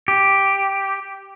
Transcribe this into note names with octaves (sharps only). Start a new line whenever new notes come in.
G4